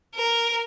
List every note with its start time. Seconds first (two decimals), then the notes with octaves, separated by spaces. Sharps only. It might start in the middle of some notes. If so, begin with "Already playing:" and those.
0.15 A#4